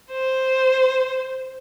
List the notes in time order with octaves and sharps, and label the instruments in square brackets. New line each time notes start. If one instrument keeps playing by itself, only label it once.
[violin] C5